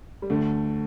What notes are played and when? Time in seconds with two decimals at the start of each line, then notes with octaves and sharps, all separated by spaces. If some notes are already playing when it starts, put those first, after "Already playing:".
0.22 G3
0.30 D2 D3 A3